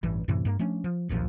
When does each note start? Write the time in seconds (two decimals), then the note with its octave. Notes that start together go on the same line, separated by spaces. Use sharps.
0.03 A1 G2 E3
0.28 F#2 A2 C3 E3
0.45 G2 A#3
0.59 F3 A3 C#4 D4
0.84 F3
1.09 D1 A#1 D#2 F3